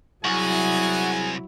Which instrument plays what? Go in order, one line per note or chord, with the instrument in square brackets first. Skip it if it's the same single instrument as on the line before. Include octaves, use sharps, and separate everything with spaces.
[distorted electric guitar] C2 [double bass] F#3 E4 [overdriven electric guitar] F#4 [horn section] G#4 G#5